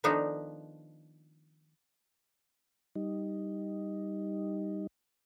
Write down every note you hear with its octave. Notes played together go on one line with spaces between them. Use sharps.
D#3 F3 A3 B3 D4 D#4
G3 D#4